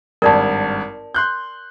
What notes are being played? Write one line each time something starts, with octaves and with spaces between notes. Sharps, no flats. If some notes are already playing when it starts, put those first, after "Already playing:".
G#1 G2 A#4 D5 A5
C6 F#6 G6